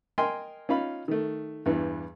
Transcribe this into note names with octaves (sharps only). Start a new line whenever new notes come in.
A#4 D#5 G5 G#5 C6
C#4 D#4 F4 F5 B5
D#3 A3
E2 G2 E3